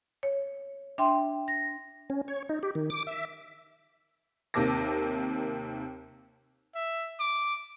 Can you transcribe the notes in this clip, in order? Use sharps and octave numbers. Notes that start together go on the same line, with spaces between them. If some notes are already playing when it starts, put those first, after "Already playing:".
C#5
D4 E5 G5 C6
A#6
C#4
C#5
D#4
G4
D#3
D6
E5
D#2 C3 A#3 A5 D6 A#6
E5
D6